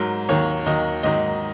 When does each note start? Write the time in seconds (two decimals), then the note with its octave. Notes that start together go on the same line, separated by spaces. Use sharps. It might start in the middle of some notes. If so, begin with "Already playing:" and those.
Already playing: G#2 F#3 A#4
0.29 D#2 D#3 F#3 C#5
0.66 D#2 D#3 F#3 D#5
1.03 G#2 D#3 F#3 D#5